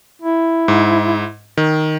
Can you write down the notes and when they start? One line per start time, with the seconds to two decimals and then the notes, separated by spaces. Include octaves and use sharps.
0.22 E4
0.68 G#2
1.57 D#3